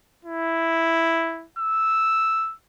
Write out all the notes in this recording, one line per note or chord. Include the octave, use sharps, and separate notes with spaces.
E4
E6